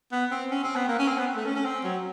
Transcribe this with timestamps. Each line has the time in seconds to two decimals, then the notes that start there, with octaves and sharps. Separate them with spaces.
0.12 B3
0.31 C4
0.51 C#4
0.63 C4
0.75 B3
0.88 A#3
0.99 C#4
1.08 C4
1.18 B3
1.36 A3
1.45 C#4
1.55 C#4
1.65 C4
1.84 F#3